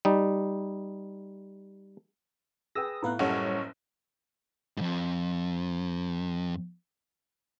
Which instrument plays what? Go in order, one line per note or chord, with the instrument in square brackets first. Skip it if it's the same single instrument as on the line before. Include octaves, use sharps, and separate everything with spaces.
[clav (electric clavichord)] G3 D#4
[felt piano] G#4 B4 G5 [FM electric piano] D#6 E6 A#6
[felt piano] A2 F5 F#6 [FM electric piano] B3 B4 A#5
[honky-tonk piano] F#1 C#4 C#5 [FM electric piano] G3 A4 F#5
[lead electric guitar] F2 G#2